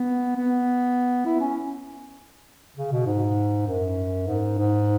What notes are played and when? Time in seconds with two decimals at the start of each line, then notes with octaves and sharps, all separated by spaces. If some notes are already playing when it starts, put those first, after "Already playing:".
Already playing: B3
0.36 B3
1.25 E4
1.40 C#4
2.77 C#3
2.92 B2
3.06 G#2
3.67 F#2
4.27 G#2
4.58 G#2